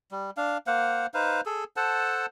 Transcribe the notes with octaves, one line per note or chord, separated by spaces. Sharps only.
G3
D4 F5
A#3 C5 F5 F#5
D#4 B4 C5 F5
G#4 A4
A4 C5 F#5 A5